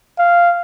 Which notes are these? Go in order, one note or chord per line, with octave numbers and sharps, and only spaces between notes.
F5